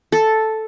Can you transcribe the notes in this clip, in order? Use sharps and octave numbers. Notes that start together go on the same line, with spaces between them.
A4